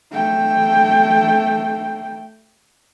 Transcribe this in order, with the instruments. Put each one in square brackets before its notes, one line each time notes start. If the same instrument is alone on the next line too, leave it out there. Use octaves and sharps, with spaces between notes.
[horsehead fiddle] A3 G5